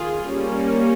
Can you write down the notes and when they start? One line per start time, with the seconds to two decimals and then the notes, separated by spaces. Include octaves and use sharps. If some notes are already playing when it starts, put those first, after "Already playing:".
Already playing: D#3 F4 G#4
0.27 G3 A#3 C#4